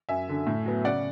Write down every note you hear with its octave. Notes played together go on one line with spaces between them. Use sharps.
F#2 E5 G#5
D3 F#3
A2
F#3 B3
C#3 D5 F#5